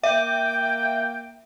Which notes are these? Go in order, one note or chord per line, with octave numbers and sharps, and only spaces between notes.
A#3 E5 G5